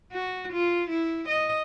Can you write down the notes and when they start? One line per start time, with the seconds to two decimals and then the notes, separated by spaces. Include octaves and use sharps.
0.12 F#4
0.53 F4
0.90 E4
1.29 D#5